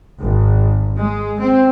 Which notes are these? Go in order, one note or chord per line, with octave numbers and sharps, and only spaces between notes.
G#1
G#3
C4